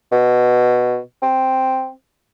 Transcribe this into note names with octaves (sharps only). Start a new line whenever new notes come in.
B2
C4